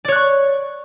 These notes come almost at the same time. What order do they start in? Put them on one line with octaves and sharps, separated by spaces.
D5 C#5 F#6 C#6